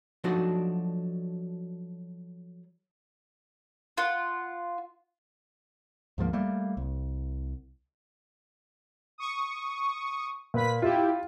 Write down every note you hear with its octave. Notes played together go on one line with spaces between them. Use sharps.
F3 F#3 A3 D4 D#4 F#4
F4 F#5
D2 G#2 F3 A#3
G3 A3 A#3
C2
C#6 D#6
A#2 B4 B5 B6
E4 F4 G4